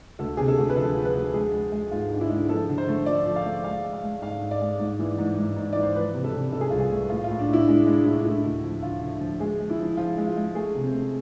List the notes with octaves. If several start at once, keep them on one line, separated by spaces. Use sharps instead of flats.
D2 A4
C3 G#4
A4
D2
B4
F3 A4
F3
B4
D2
G#3 G#4
G#3
G#3
G#2 F4
G#2 D4
E4
G#3
F3 A4
D3
C5
A3
F3 D5
F3
F5
A3
G#3 F5
G#3
F5
G#3
G#2 F5
G#2
D5
G#3
G#2
E3
G#2
G#2
G#2
E3 D5
C5
F3 B4
C3
A4
C3
C3 A4
G#4
C2 F4
G#4
A3
A2 F4
F4
A2
D4
A2
E4
G#3 D4
G#3
D4
A2 E4
D4
A3 E4
D2
F3
D3 F4
D3
F3
G#3 G#4
G#3
E4
F3
F3 F4
G#3
F4
G#3
A3 G#4
C3
C4
A3